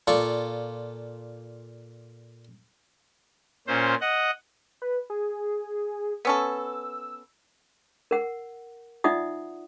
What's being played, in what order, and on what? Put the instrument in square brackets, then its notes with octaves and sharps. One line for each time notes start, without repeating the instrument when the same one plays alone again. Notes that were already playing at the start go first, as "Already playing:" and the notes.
[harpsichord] A#2 F4 A4 D5 C#6
[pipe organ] A#2 C#4 C5
D#5 F#5
[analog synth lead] B4
G#4
[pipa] B3 C#4 A4 [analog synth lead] E6
[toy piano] A#4 F#5
D#4 F4 D5 E5 F#5 D#6